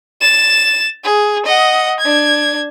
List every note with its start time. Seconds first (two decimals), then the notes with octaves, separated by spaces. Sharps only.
0.21 A6 E7
1.04 G#4
1.46 D#5 F#5
2.00 D4 G#6